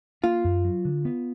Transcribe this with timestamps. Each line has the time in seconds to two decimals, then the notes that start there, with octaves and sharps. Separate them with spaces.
0.24 A#3 F4
0.44 F#2
0.64 F#3
0.85 D3
1.05 B3